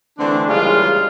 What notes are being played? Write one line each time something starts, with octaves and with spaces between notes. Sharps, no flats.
D3 E3 A3 C4 D4
C#3 E3 G3 G#3 A#3 F4